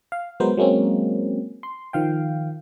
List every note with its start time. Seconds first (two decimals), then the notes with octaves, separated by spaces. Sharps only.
0.12 F5
0.40 F#3 G#3 B3 A#4 C5
0.57 F#3 G#3 A#3 C4 C#4
1.63 C6
1.93 D#3 F3 F5 G5